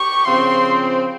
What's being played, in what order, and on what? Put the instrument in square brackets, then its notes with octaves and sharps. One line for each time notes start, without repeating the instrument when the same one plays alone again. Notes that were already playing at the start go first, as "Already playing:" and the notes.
Already playing: [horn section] G4 [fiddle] C#6
[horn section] C#3 F3 C4 [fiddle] C6